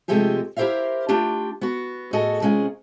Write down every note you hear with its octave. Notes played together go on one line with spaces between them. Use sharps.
C3 F3 G#3 A3 G4 G#4
E4 G4 A#4 C5 E5 F5
A3 D4 F4 G4
B3 F#4
A2 F#4 G#4 A4 D#5 A5
C3 G#3 C#4 F4 G#4